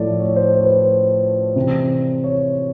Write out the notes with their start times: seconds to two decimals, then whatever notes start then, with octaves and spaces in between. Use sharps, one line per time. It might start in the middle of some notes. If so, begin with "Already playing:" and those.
Already playing: A2 F3 A4 C#5 D5
0.20 C#5
0.36 C5
0.54 C5
0.64 B4
0.70 C5
1.56 C3 E3
2.24 C#5